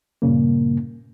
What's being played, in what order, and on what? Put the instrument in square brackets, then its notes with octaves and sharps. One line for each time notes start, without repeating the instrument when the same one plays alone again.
[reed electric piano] G2 A#2 C#3 A#3